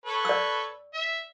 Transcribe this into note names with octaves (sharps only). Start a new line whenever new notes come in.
A4 B4 C#5
D5 E6
E5